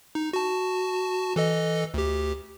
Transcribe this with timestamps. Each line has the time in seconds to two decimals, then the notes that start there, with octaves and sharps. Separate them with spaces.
0.15 D#4
0.33 F#4 A5
1.36 E3 A4 D#5
1.94 D2 G4